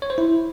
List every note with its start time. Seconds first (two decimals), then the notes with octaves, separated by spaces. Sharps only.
0.02 C#5
0.10 C5
0.18 E4